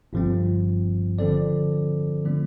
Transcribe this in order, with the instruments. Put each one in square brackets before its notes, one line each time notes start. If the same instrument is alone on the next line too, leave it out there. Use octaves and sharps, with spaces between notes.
[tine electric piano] G1 G2 F3 C4
D3 F3 C4 A4 D5
D3 F3 A3 D4